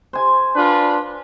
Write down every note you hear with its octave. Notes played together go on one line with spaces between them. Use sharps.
C5 G#5
D4 F4 B4